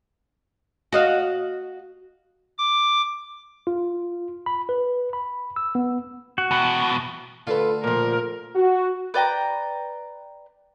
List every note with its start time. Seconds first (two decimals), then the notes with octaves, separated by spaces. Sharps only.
0.92 F#4 D#5 F5
2.58 D6
3.67 F4
4.46 B5
4.69 B4
5.13 B5
5.56 E6
5.75 B3
6.38 F#4
6.51 E2 B2
7.47 D3 A3 F4 A4 B4
7.84 A#2 F3 A#4
8.55 F#4
9.14 B4 D5 G5 A#5